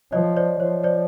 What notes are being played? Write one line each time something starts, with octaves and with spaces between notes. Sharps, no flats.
F3 C#5 D#5
C5 D5
F3 C#5
C5 D5